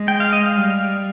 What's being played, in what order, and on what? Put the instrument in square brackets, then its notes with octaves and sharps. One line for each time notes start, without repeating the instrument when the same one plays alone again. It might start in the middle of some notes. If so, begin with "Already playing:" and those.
Already playing: [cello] G#3
[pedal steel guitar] G5
F5
D#5
F5
[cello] G3